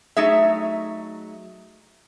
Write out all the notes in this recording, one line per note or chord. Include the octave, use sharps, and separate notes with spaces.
F#3 A3 D#4 G#4 E5